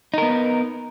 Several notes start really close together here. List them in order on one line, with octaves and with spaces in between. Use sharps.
D#4 A#4 B3